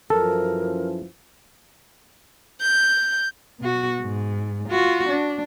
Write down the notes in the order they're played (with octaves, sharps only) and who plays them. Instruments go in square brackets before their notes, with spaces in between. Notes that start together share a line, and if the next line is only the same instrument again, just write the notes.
[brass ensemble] F#2 E3 F3 [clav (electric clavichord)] A4 [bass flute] A#4
[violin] G6
[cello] B2 F#4
G#2
F4 F#4
D4